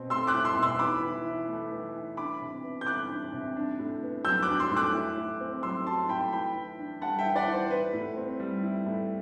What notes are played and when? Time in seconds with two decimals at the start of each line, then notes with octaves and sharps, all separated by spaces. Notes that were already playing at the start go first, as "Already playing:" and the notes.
Already playing: B2 C4
0.10 A3 C6 E6
0.27 D6 F#6
0.34 E4
0.45 C6 E6
0.57 B2
0.62 C6 E6
0.79 E3 B5 D6
1.02 E3
1.26 E4
1.48 A3
1.71 E3
1.95 E3
2.17 D4 B5 D6
2.41 C3
2.63 B3
2.81 G6
2.86 E3 D6 F#6
3.10 D4
3.33 C3
3.56 D4
3.79 A2
4.03 B3
4.25 F#3 E6 G6
4.43 D6 F#6
4.49 D4
4.60 C6 E6
4.71 A2
4.77 D6 F#6
4.94 E4
5.17 A2
5.41 C4
5.63 F#3 C6 E6
5.86 E4 A5 C6
6.09 A2 G5 B5
6.32 E3 G5 B5
6.55 E3
6.79 D4
7.02 G3 F#5 A5
7.18 E5 G5
7.25 E3
7.36 D5 F#5
7.47 E3
7.53 C5
7.71 E4 B4
7.93 A2
8.16 C4
8.40 G3
8.63 E4
8.86 A2